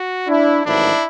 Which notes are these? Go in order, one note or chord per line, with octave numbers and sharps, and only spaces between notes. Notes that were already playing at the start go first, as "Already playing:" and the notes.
Already playing: F#4
D4 E4
A1 G#2 D#3 F#3 D4 E4